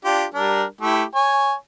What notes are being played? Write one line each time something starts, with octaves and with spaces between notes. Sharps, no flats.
D4 F4 G4
G3 D4 A#4
A3 E4 G4
C#5 G#5